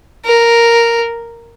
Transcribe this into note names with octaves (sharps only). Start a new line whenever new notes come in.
A#4